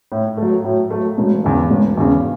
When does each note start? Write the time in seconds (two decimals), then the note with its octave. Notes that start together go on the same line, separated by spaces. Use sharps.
0.12 A2
0.37 F#3 A3
0.64 A2
0.91 F#3 A3
1.18 E1
1.44 E2 C#3
1.70 E1
1.97 E2 C#3